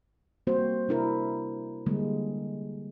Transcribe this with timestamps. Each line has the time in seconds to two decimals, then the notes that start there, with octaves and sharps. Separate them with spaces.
0.47 G3 A#3 C4 F#4 C5
0.88 C3 D4 E4 A#4
1.86 D3 G3 G#3 A#3